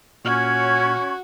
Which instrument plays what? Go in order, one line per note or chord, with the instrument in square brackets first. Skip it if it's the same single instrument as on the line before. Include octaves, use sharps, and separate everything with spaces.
[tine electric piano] A#2 F6 [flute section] C#4 C#6 [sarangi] F#4